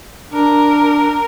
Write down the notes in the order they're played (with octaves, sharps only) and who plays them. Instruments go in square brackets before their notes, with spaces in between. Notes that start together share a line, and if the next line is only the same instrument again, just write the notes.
[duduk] D4 [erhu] A#4